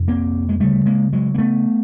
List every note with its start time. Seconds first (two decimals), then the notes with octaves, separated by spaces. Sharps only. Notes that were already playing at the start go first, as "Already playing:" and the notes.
Already playing: F2 C3
0.08 A#3 C4
0.49 G#3
0.60 D2 C#3 G3 A3
0.86 G#3 A#3
1.13 F#3 G#3
1.34 A#3
1.38 A3 B3